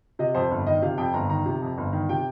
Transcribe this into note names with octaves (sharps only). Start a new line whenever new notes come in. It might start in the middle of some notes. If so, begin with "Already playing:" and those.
C3 D#5
F2 C5
G1
D#3 D#5
C3 F5
F2 G5
G1 A#5
D#3 A#5
C3
F2
G1
D#3
C3 G5